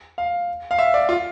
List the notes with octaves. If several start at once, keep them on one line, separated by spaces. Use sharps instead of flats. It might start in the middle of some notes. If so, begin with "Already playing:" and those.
F5
F5
E5
D5
F4